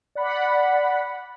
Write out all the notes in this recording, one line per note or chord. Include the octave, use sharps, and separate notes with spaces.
D5 F#5 B5